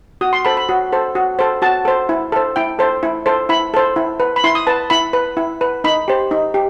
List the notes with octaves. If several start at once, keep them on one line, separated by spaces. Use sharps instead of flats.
F#4 D#6
C6
A4 C5 B5
B5
F#4
A4 C5
F#4
A4 C5
F#4 A5
A4 C5
E4
A4 C5
E4 G5
A4 C5
E4
A4 C5
E4 B5
A4 C5
E4
B4
B5
E4 C6
D#6
B4 A5
E4 B5
B4
E4
B4
D#4 B5
G4 C5
D#4
G4